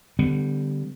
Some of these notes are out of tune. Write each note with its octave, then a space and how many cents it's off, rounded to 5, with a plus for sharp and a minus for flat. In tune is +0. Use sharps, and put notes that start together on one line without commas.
D3 +0 G3 +0 B3 +30